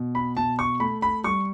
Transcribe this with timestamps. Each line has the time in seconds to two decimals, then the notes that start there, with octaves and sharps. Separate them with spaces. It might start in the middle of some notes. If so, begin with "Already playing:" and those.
Already playing: B2
0.15 B5
0.37 B2 A5
0.59 C#6
0.80 A3 B5
1.02 B5
1.24 G3 C#6